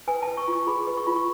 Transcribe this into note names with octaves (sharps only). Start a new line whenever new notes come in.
B4 G#5
A5
B4
C#6
F4 C#6
G#4 B5
B4
C#6
F4 B5
C#6